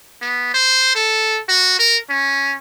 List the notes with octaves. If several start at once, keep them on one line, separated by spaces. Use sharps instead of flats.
B3
C5
A4
F#4
A#4
C#4